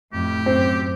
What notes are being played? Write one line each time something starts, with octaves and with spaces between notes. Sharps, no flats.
F2 A2 G4
F#2 C4